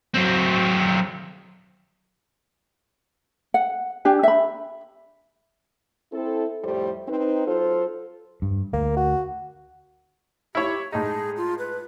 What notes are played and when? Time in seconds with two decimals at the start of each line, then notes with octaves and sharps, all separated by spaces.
0.14 F#3 C4
3.54 F#5
4.05 D4 G4 G#5
4.23 E5 B5
6.13 C4 E4 A4
6.64 F2 A2 G3 A3 G4 C5
7.08 C4 D#4 B4
7.47 F#3 F4 A4 C5
8.42 G2
8.73 D2 A#3
8.96 F#4
10.55 E4 G4 C#5
10.92 A2 G#3 D#4 G#4
11.37 F4
11.59 B4